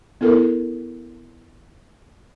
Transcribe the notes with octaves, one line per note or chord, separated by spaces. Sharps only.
B3 E4 A4 A#4